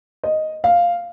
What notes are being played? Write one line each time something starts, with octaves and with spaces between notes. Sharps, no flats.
D#5
F5